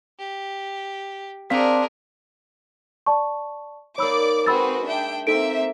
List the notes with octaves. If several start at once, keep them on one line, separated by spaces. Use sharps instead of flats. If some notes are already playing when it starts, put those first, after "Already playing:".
G4
C4 D4 G#4 A#4 C5 F5 B6
D5 A5 C#6
A#3 D#4 C#5 D5 B5 D6 E6
G#3 C4 F#4 G#4 B4 B5 E6 A6
D4 E5 G5
A#3 C4 D#4 A4 E5 D7